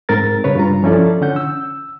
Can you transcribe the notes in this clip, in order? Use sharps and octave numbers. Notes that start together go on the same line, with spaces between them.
G#2 C4 A#4 A6
G2 C#3 B4 C#5
G2 F4 A#5
F3 C#4 E4 F4 A4 D5
D3 C#4 F#5 G6
E6